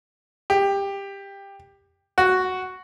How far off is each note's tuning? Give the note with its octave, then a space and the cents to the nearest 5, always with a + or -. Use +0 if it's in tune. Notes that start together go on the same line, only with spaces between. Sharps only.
G4 +15
F#4 +0